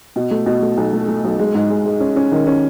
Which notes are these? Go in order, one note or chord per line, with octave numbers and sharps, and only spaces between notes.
B2
A3
B2
A3
B1
A3
A3
B1
G#3
G#2
G#3
G#3
C#4
C#4
D#3
C#4